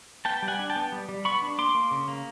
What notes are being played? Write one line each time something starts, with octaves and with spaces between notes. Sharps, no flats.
B3 G5 A5
G3
F#5 G#5
D4
G5 A5
B3
G3
G3
B3 B5 C#6
D4
A#3 C6 D6
A#3
C#3
A#3